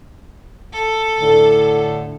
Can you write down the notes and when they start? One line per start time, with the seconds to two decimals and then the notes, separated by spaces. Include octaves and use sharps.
0.73 A4
1.19 A2 D3